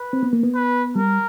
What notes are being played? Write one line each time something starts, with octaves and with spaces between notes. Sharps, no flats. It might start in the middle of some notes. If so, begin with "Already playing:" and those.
Already playing: B4
C4
B3
A#3
B3
B4
G3 A#4